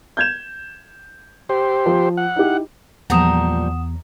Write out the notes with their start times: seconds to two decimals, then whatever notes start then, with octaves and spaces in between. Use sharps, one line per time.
0.17 G6 G#6 E7
1.49 G4 C5
1.86 F3
2.17 F#5
2.36 D#4 E4 G4
3.10 E2 A#2 F3 G3 F#5 A#5 D#6 E7